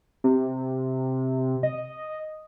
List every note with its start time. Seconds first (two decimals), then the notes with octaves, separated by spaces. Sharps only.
0.24 C3
1.63 D#5